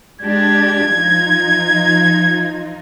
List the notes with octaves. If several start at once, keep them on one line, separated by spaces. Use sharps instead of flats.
G#3 D4 G4 G#6
F3 D#4 F4